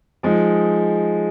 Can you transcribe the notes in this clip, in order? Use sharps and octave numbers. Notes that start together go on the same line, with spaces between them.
F3 G#3 D#4